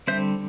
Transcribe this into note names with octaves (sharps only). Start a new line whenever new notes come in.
D3 G3 C4 C5 E5